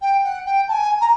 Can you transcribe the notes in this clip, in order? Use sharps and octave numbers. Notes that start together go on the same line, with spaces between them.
G5
F#5
G5
A5
G#5
A#5